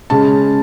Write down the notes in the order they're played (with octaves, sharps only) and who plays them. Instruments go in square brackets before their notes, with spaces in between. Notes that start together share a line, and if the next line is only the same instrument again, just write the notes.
[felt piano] C#3 G#3 C#4 A5